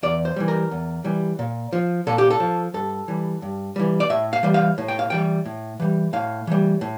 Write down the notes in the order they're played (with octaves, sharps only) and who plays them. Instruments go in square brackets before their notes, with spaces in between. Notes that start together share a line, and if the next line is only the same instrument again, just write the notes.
[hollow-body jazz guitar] E2 D5
C5
E3 G3
A#4
E2
E3 G3
A#2
F3
A#2 A4
G4
A4
F3
G2 A4
E3 G3
G2
E3 G3
D5
A2 E5
F5
E3 G3
F5
A2
G5
F5
E3 G3 G5
A2
E3 G3
A2 F5
E3 G3
A2